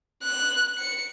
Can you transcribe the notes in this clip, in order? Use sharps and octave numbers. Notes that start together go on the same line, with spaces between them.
F#6
C#7